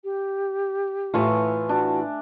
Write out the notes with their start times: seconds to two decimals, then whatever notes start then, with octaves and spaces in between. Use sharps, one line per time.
0.04 G4
1.14 A2 E3 A3 F4 G#5 C#6
1.69 D4 F#4